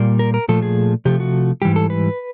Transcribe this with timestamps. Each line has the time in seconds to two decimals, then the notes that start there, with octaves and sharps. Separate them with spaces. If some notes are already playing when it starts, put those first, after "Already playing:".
Already playing: A#2 G3 A#3
0.19 A#4
0.34 A#4
0.48 A#2 F3 A3 A4
0.62 G#4
1.05 C3 F3 A3 G4
1.20 F#4
1.62 G#2 E3 G3 G4
1.76 A4
1.90 B4